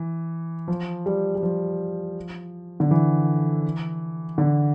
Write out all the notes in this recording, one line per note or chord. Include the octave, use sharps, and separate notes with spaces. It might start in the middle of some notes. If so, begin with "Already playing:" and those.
Already playing: E3
F3
G3
G3
F3
D3
E3
D3